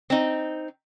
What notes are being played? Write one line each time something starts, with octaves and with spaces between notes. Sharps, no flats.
C4 D#4